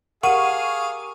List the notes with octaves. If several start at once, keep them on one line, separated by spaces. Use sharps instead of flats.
G4 G#4 A#4 F5 F#5 C#6 D#7